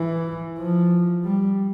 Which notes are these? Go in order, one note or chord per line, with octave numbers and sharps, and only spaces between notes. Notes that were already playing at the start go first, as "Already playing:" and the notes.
Already playing: E3
F3
G3